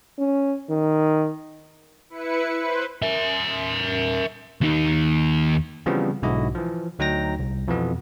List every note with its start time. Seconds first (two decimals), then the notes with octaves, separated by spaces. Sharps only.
0.18 C#4
0.69 D#3
2.10 E4 B4 C#7
2.56 B4 C5
3.02 A#4 E5
4.61 D#2 D#4
5.86 C#3 E3 F3 G3 B3 C4
6.22 B1 G#2 D3 E4 F#4 D#5
6.55 E3 F3
6.99 D2 F#3 D#4 G5 A#5 A#6
7.39 C2
7.68 F2 B2 E3 B3